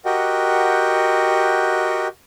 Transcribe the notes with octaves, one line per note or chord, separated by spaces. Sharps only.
F#4 G4 A#4 D#5 F#5 G5